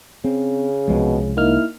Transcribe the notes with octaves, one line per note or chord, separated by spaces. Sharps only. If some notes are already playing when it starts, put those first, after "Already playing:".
C#3 C4
C2 B2 F3 G#3
A#3 D#4 E4 F6